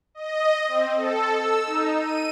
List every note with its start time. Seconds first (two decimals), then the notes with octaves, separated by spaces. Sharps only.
0.15 D#5
0.68 C4
0.96 A4
1.33 E6
1.66 D#4
1.97 D#7